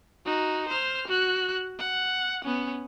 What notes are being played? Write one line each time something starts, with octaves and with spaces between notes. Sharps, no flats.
D#4 F#4
C5 F6
F#4 F#6
F#5
B3 C#4